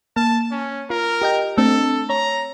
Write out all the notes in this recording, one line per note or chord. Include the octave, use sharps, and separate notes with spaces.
A#3 A5
C#4
F4 A#4
G4 D#5 G5
A3 C4 D4 A4
C#5 A#5